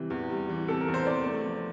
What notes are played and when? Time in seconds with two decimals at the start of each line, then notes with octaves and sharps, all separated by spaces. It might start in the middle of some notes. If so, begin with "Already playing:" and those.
Already playing: C3 E3 G3
0.10 E2
0.30 G3
0.49 E3
0.68 C3 A4
0.81 A#4
0.88 E2
0.94 C5
1.06 C4 D5
1.26 A3
1.45 F3